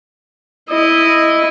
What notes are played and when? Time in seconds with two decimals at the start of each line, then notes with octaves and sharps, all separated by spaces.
0.69 E4 D#5